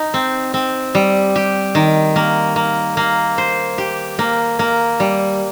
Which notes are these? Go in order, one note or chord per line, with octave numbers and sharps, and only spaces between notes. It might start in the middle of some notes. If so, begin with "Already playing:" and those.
Already playing: D#4
C4
C4
G3
G4
D#3
A#3
A#3
A#3
C5
G4
A#3
A#3
G3